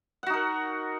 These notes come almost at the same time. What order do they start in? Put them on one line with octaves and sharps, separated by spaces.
F#5 F#4 D#4 A#4